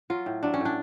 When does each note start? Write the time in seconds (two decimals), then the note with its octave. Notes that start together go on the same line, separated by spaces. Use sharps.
0.10 F#3 F4
0.26 A2
0.43 F#3 D4
0.54 C#4
0.60 A2 D4